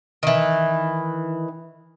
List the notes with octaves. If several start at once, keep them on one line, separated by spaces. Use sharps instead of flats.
D#3 E3